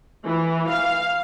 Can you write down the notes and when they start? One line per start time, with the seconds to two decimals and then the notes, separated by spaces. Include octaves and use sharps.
0.25 E3
0.70 F5